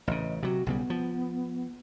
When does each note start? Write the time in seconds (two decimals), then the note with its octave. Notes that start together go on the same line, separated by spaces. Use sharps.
0.07 A1 C#3 D#5
0.43 C3 F#3 F#4
0.66 B1 C#3 G3 B3
0.90 F3